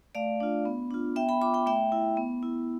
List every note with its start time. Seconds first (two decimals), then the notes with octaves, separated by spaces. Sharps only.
0.15 A3 D5 F5
0.40 D4 F4
0.65 B3
0.91 D4 F4
1.16 B3 E5 G5
1.29 G5 B5
1.41 F4 B5 D6
1.54 G5 B5
1.66 A3 E5 G5
1.92 E4
2.17 B3
2.43 E4